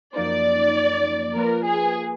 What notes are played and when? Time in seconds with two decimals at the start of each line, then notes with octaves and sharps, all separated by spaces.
0.16 F#2 F3 A#3 D#4 D5
1.35 F3 A#3 F4 A#4 B4
1.64 G#4